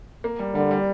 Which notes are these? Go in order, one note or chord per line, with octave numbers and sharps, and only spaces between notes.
A#3
G3
D3 G3
G3